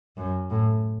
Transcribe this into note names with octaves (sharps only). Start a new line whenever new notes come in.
F#2
A2